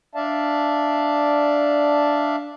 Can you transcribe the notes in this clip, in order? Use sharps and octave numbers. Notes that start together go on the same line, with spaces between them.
D4 D5 E5 F5 A5